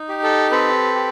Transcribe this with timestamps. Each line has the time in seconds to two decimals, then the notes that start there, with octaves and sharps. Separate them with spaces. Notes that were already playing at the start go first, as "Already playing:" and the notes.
Already playing: D#4
0.09 G4
0.23 A4
0.51 C4 A4 B4
0.95 G4